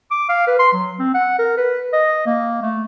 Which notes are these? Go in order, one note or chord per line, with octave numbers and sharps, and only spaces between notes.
D6
F5
B4
C6
F#3
C4
F#5
A#4
B4
D#5
A#3
A3